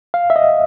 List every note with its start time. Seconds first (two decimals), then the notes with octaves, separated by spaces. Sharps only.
0.14 F5
0.30 E5
0.36 D#5